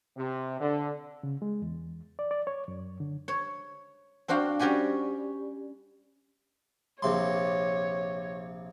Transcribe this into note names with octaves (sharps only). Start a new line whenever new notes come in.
C3
D3
C#3
G#3
E2
D5
D5
C#5
F#2
D3
C#5
C4 D4 F#4 F5 G5
G3 C#4 F#4 G4 G#5
A#1 C3 C#5 C6